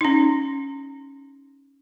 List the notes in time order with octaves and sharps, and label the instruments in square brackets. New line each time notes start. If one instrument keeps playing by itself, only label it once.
[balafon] C#4 D#4